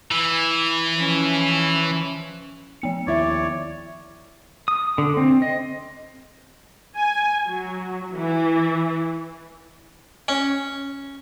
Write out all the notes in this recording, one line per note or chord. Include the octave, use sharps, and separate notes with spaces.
E3
F3 C#4
F3 B3 C#7
D#2 E4 C#5 D5 E5
D#6
D3
C4
D#5
G#5
F#3
E3
C#4